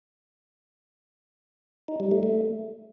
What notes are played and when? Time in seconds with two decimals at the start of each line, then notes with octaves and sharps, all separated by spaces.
1.88 D#4
2.00 G3
2.11 A3
2.23 A3